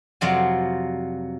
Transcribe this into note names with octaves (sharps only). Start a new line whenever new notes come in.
F2 C3 F#3 F4 D5 G#5